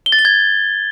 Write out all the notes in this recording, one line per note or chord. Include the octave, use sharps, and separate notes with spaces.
G7
A6
G7
G#6